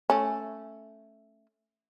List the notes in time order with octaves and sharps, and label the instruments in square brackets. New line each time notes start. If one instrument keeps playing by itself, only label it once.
[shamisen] A3 C#4